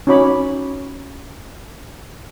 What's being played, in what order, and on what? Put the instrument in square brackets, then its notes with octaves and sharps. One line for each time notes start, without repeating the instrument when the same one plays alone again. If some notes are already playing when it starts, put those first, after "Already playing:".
[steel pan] C#4 D#4 F#4 C#5 B5 D6